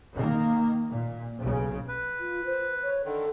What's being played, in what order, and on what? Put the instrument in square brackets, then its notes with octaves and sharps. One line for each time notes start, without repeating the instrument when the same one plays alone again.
[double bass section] D#3 A#3
A#2
B1 C#3
[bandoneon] B4
[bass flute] F4
C5
C#5
[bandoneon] D3 D#3 [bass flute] A4